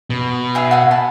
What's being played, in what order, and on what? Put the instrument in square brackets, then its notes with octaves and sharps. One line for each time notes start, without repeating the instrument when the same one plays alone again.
[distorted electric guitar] B2
[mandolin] E4 G#4
F#5 G#5 F#6
G#5 A5 B5